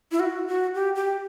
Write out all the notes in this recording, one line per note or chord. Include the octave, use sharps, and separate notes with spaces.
E4
F#4
F#4
G4
G4